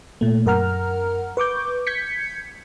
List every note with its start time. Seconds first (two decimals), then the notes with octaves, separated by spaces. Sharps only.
0.21 A#2 A3
0.46 F#2 A#4 F#5 A#5 F6
1.37 B4 C#6 D6 G6
1.87 G6 G#6 B6 C#7